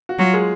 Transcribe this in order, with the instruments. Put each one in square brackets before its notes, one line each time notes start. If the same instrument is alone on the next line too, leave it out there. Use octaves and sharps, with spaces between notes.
[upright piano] F#4
[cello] F#3 [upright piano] F4
[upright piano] G#3 G#4